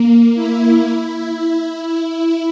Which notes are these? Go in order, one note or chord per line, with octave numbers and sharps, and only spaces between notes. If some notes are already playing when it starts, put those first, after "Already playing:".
Already playing: A#3
E4
E4